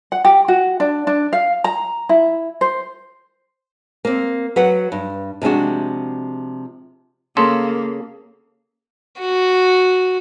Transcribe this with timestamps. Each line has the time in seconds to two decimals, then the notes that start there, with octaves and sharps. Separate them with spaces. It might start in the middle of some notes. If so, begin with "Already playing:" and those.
0.12 F#5
0.25 G4
0.48 F#4
0.80 D4
1.07 D4
1.33 F5
1.64 A#5
2.09 E4
2.61 C5
4.05 A#3 C4
4.56 F#3 B4 F#5
4.92 G2
5.42 C3 F3 G#3 D4 F#4
7.37 C#3 A#3 A4 C6
9.19 F#4